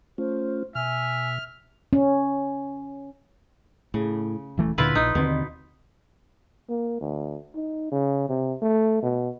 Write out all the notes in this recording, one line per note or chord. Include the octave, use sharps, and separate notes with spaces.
A3 C#4 F4 C5
B2 E5 G#5 F6
C#4
A2 C#3
D#1 E3 A3
D2 A#2 D3 E4 F4 B4
A#1 D#4
D#2 B2 D3 C4
A#3
D2
D#4
C#3
C3
A3
B2